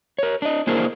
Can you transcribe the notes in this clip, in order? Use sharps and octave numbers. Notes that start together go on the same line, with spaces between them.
A#4 C#5
D4 D#5
A#3 D4 E4 G#4 A#4 C5